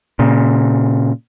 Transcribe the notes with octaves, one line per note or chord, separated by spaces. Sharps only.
A#2 C#3